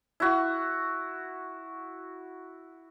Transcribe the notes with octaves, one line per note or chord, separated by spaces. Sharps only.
E4 F#4